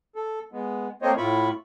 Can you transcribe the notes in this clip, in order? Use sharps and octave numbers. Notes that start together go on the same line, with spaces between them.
A4
G#3 B3
A3 A#3 C4 C5 C#5 D#5
A2 E4 F4 B5 C#6